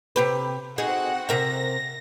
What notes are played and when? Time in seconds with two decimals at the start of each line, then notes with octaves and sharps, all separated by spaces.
0.16 C3 G4 B4
0.78 C4 D#4 F#4 G#4 F#5
1.29 C3 A#4 E5 A#6